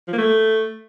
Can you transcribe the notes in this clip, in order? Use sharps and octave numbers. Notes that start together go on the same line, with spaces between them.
F3
A#3
A3